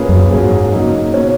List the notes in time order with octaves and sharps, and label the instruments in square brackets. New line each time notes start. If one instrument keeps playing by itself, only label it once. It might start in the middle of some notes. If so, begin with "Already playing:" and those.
Already playing: [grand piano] A#2 A#3 C#4 G#4 B4
[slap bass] F#2
[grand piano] G#2 F#3 A#3 C#4 G#4
C#3 F#3 A#3 D#4
B2 A#3 C#4